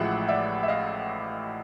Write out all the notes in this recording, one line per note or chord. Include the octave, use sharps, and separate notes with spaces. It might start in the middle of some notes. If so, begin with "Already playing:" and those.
Already playing: A1 A2 F3 G#3 E5 F#5
D5 E5
E5
D#5 F5